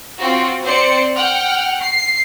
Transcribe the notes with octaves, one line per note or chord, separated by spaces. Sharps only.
C4 F4 F#4
C4 C5 D5 C#7
F#5 G5 F6
C7